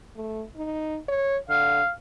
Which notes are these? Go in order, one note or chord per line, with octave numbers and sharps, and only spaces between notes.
A3
D#4
C#5
D3 F5